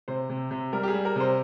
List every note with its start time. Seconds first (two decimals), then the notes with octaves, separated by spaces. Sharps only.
0.08 C3 C5
0.30 C3
0.51 C3
0.72 G3 A#4
0.83 G4
0.88 G#4
0.94 G3
1.05 A#4
1.16 C3 C5